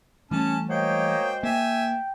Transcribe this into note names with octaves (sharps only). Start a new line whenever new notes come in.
E3 G3 A3 C#4 A5
G#3 A#3 F#4 C5 C#5 D#5 G5
A#3 E5 G5 G#5